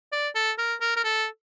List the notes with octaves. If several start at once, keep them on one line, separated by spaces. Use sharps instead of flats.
D5
A4
A#4
A#4
A#4
A4